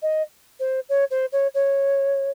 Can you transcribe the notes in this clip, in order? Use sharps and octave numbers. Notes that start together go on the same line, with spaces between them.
D#5
C5
C#5
C5
C#5
C#5